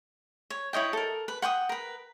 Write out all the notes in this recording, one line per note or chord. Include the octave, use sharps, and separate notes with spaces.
C#5
E4 C#5 D#5 G5
A4 A#4
B4
F#5 G5 D6 D#6
A#4 B4